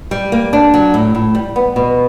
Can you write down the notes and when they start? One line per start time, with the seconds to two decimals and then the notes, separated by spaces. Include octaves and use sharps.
0.11 G3
0.32 A#3
0.53 D4
0.74 F#3
0.94 A2
1.15 A2
1.35 G3
1.56 B3
1.76 B2